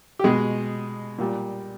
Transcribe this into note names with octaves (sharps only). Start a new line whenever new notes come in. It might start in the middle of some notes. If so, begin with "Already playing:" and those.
G4
B2 G#3 G#4
A#2 G3